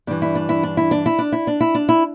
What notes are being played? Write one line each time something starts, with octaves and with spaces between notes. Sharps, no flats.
G2 E3 D4
E4
D4
E4
D4
E4
D4
E4
D4
E4
D4
E4
D4
E4